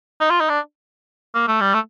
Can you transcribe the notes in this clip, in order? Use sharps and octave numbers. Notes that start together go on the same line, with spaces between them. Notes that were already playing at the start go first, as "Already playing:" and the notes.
D#4
F4
D#4
D4
A#3
A3
G3
A3